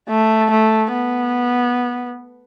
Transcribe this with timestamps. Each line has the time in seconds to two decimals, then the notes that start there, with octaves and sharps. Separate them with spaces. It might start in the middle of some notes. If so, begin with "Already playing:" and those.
0.09 A3
0.51 A3
0.93 B3